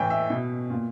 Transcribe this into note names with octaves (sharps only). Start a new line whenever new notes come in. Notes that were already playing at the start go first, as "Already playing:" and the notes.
Already playing: A2 E3 G5
E5
B2
A#2